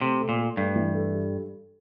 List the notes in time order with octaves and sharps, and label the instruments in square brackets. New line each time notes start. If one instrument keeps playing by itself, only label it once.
[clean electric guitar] C3 [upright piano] A3
[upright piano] A4
[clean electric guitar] A#2
[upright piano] A4
[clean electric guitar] G2 [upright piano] A3
[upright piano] E3
A4
G4